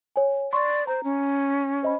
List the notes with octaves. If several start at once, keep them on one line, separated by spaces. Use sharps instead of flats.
C#5 G#5
D5 C6 C#6
C5 A#5
C#4
C5 D#5 B5